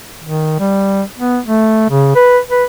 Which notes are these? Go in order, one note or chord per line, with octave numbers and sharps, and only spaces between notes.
D#3
G3
B3
A3
C#3
B4
B4